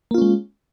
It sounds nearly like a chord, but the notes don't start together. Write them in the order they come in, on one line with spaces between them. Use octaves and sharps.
A#3 F4 C#4 G#3